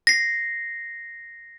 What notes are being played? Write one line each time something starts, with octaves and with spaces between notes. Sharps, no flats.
A#6 C7